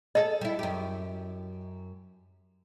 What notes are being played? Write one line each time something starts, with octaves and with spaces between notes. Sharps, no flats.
G#4 A4 D#5
G3 E4
F#2 G4